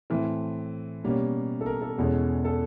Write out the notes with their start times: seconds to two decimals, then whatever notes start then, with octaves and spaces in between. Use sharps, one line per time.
0.10 A2 E3 A3 C4
1.04 B2 G3 A#3 C#4
1.61 A4
1.66 A#4
1.82 A4
1.98 E2 B2 G#3 C#4
2.45 A4